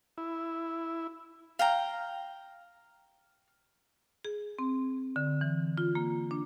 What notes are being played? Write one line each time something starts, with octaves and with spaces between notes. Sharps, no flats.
E4
F5 G5 A#5
G#4
C4
D3
E3
F4
A#3
D4